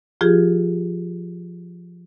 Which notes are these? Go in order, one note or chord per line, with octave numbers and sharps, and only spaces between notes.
F3 F4 G4 G#4